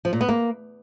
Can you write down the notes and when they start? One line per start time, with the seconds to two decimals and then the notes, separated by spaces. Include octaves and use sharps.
0.05 F3
0.13 A#2
0.21 B3
0.29 A#3